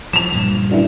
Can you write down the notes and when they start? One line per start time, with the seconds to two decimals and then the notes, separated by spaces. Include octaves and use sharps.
0.13 F3 E7 F7
0.32 G2 A#2 F3
0.69 F#2 D3 E3